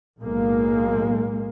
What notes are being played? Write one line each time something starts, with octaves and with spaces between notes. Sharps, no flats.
B1 A2 G#3 A#3